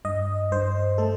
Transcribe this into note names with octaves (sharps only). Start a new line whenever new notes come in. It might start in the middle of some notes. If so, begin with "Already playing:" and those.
G2 D#5
G2 C5
A3 A4